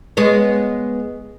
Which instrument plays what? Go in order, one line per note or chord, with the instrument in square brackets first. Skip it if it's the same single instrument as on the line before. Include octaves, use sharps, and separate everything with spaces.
[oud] G#3 B3 C#5